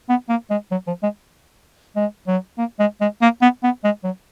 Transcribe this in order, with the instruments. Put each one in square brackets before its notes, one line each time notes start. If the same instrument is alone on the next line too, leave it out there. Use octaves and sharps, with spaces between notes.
[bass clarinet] B3
A#3
G#3
F#3
F3
G#3
G#3
F#3
A#3
G#3
G#3
A#3
B3
B3
G#3
F#3